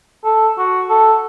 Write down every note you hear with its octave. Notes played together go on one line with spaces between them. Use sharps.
A4
F#4
A4